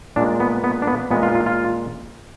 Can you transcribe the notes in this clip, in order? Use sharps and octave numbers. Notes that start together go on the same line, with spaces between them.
A#2 G#3 D4
B3
B3
D4
B3
A#2 G#3 B3
F4
F4
F4